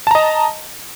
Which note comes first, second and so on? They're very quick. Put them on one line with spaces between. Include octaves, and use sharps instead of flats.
A5 A#5 D#5